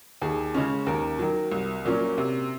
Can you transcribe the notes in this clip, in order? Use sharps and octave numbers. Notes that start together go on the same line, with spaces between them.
D#2 G#4
C#3 G#3 C#4
D#2 A#4
D#3 F#3
C2
A#2 F#3 A#3 C#4
C3